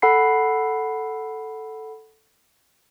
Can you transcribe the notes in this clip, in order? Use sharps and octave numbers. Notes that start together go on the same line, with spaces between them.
A4 F#5 B5 C7